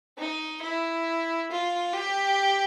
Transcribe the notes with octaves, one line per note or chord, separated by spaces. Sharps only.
D#4
E4
F4
G4